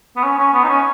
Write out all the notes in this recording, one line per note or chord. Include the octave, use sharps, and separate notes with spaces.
B3
C#4
C#4
B3
D#4
C#4